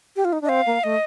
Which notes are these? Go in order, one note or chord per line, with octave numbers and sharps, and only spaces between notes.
G4
F4
D#4
D4
D#5
C4 F5
A#3
A3 D#5